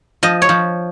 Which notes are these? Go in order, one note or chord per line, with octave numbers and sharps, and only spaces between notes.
F3 D#5
C#5
F3